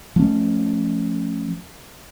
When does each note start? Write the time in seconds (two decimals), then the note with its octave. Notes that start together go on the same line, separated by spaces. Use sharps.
0.16 F3 A3 C#4